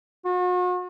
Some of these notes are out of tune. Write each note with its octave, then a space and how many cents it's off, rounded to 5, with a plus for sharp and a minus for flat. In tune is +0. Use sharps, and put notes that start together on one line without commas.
F#4 -40